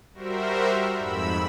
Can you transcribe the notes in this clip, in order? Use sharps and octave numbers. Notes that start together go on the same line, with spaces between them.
G3 F#4 A#4 C5 E5
F2 G#2 B5 E6